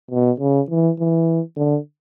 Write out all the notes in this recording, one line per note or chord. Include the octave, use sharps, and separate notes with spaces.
B2
C#3
E3
E3
D3